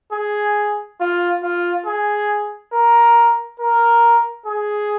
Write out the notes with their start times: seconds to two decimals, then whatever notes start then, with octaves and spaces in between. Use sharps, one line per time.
0.13 G#4
1.00 F4
1.43 F4
1.86 G#4
2.73 A#4
3.60 A#4
4.46 G#4